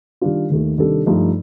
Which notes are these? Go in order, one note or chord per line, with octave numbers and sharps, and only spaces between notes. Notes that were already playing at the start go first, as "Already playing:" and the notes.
D#3 G3 D4 F4
D#2 D#3 A3
C3 D#3 G3 D4 A4
G2 F3 A3 D#4